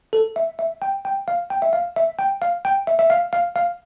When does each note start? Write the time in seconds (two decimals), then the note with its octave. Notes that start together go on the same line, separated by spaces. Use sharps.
0.13 A4
0.36 E5
0.59 E5
0.82 G5
1.05 G5
1.28 F5
1.50 G5
1.62 E5
1.73 F5
1.96 E5
2.19 G5
2.42 F5
2.65 G5
2.87 E5
2.99 E5
3.10 F5
3.33 F5
3.56 F5